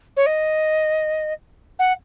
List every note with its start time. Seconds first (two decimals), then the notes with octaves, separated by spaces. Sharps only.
0.16 C#5
0.26 D#5
1.79 F#5